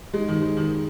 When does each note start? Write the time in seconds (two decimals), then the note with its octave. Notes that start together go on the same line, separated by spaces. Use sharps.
0.13 G#3 D#4
0.28 D#3
0.35 G#4 C5
0.42 G#3
0.57 D#3 D#4